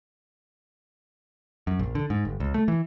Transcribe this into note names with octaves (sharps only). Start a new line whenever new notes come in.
F#2
A#1
D3
G#2
G1
C#2
A3
E3